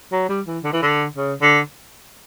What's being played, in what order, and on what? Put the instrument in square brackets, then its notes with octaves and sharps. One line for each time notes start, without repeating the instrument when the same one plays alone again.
[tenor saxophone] F#3
G3
E3
D3
E3
D3
C#3
D3